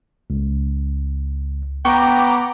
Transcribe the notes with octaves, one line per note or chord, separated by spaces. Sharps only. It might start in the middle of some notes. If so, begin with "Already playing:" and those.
C#2
B3 G5 A#5 C#6 D6